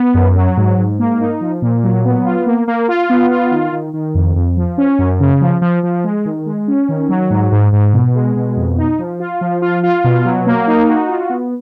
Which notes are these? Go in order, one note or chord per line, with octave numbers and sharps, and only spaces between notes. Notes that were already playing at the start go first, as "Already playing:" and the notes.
Already playing: B3
F#2
F#3
G#2
G#2
A#3
D#4
F3
A#2
F#3
B3
F4
A#3
A#3
F4
B3
F4
D#3
D#3
D#3
F2
F2
F3
C#4
F#2
C#3
F3
F3
F3
G#3
D#3
G#3
C#4
D#3
F#3
G#2
G#2
G#2
B2
G#3
B2
F2
D#4
F3
F4
F3
F4
F4
B2
F#3
A#3
D#4
F#4
F4
B3